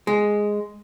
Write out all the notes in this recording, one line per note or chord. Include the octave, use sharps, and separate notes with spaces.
G#3